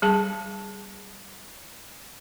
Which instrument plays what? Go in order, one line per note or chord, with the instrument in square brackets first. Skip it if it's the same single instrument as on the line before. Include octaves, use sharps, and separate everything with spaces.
[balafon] G3 G#4 A5